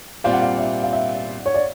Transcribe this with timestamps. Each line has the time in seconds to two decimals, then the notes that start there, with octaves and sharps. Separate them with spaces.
0.24 A#2 G3 C4 F4 F5
0.33 F#5
0.42 F5
0.58 E5
0.83 F5
0.93 E5
1.46 C#5
1.54 D5